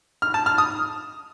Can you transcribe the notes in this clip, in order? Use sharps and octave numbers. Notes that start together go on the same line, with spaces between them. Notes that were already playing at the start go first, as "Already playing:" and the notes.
F6
A5
F6
D#6